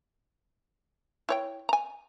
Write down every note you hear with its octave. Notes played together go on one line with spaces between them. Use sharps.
E4 C#5 G5
G#5 A#5